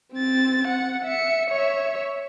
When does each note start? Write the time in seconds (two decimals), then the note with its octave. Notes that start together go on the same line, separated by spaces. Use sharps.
0.13 C4 A6
0.68 F#5
1.05 E5 C#7
1.50 C#5 E5